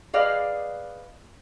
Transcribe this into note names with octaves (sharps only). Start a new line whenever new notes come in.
G#4 B4 D5 D#5 F5